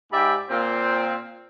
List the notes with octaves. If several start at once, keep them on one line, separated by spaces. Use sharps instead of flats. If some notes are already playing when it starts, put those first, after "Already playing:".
G#2 G4 D5 E5 G5 B5
A#2 C4